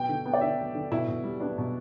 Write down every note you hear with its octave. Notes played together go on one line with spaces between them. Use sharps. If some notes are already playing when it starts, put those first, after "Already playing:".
Already playing: B2 B3 G5
D3
B3
D5
D3 E5
B3
D3
B2 E4
B2
G3
B3 D4
B2